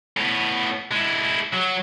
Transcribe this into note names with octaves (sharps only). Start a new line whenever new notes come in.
A2 B3
G#3 E4
F#3